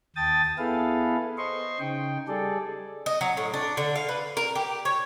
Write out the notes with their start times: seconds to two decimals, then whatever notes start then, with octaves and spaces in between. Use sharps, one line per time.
0.16 D#2 G5 A5 D#6 A6
0.58 B3 E4 G#4 A4 B4 F5
1.38 C5 D#5 C6 C#6
1.80 C#3 D#4 G5
2.28 G3 G#4 A4 D5
3.06 D#5
3.21 F#3
3.37 A2
3.54 D4
3.77 D3
3.96 F5
4.09 B4
4.37 A#4
4.55 G4
4.85 C#5